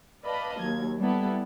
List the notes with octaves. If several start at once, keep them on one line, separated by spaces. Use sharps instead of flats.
B4 D5 D#5 F5 A5 B5
D#2 F#3 G#6
G3 B3 E4 A4